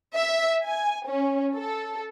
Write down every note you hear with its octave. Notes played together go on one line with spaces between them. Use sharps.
E5
G#5
C#4
A4